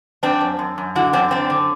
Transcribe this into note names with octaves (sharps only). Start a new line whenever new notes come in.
F#2 C4 D4
F#2
F#2
F#2
D3 E4 F#4
F#2 C4 D4
F#2 C4 D4
D3